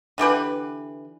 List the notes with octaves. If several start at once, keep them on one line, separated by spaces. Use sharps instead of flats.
D3 E3 G4 B4